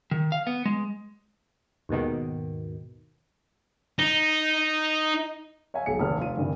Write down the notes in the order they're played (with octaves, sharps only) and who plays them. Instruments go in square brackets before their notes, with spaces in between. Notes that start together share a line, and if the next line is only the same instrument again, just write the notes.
[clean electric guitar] D#3
F5
B3
G#3
[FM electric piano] D#2 G#2 B2 D#3
[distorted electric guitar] D#4
[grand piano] C#5 E5 F5 G#5
B1 G#3 C#7
F1 D#2 F6
F1 F4 D#7
G2 C3 D#3 E3